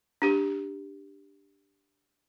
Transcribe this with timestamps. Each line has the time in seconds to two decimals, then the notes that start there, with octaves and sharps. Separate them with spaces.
0.22 D4 G4